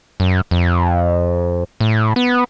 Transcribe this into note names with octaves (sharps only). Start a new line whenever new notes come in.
F#2
F2
A2
B3